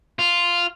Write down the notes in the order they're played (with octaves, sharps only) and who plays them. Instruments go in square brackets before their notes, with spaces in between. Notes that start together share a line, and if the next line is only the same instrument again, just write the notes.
[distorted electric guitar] F4